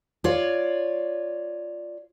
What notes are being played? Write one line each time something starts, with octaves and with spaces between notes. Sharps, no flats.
F4 C#5 D5